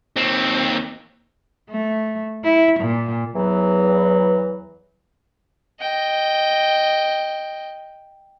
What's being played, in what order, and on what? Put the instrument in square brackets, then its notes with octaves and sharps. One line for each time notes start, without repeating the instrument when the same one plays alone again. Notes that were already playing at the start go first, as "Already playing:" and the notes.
[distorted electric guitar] D#2 C4
[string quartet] A3
E4
A#2
[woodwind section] E2 E3 F#3
[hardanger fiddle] D#5 G5